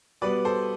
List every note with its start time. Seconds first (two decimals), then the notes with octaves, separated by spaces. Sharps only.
0.22 B2 G3 B3 B4 D5
0.45 A4 C5